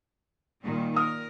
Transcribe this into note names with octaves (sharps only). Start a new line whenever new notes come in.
A#2 D#3 G3
A#4 D#6 F6